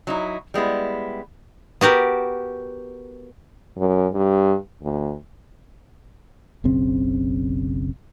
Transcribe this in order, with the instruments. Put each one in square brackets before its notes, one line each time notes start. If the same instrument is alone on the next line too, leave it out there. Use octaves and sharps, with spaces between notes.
[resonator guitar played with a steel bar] F#3 D#4 E4
G3 G#3 B3 E4
[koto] B3 F#4 G4 A#4
[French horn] F#2
G2
D2
[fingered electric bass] F#1 B1 C#3 C4